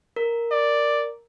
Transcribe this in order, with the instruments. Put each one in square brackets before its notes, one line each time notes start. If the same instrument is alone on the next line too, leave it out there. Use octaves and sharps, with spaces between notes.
[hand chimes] A#4
[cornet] D5